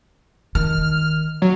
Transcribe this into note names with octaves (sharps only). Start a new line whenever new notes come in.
D#3 F6
F#3